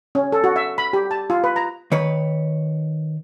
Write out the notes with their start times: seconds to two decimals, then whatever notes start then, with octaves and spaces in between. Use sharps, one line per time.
0.15 C#4
0.32 A4
0.44 F#4
0.56 E5
0.78 B5
0.93 G4
1.11 A5
1.30 F4
1.44 B4
1.56 A#5
1.92 D#3 B4 C#5